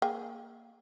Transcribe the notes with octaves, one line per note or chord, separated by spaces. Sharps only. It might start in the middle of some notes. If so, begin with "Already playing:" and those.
A#3 G#4 G5